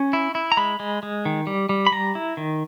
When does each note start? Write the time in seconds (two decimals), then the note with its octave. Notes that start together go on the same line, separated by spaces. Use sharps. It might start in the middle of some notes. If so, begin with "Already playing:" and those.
Already playing: C#4
0.13 E4
0.35 E4
0.52 A#5
0.57 G#3 B5
0.80 G#3
1.03 G#3
1.26 D#3
1.47 G3
1.69 G3
1.87 B5
1.92 G3 A#5
2.15 E4
2.37 D#3